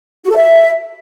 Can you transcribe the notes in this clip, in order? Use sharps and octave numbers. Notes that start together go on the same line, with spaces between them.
F#4
A4
E5